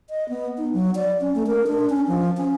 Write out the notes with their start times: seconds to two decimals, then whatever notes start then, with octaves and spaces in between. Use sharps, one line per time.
0.10 D#5
0.29 B3
0.58 D#4
0.73 F#3
0.95 D5
1.21 C#4
1.35 A3
1.47 A#4
1.67 D4
1.89 C#4
2.07 F3
2.37 C#4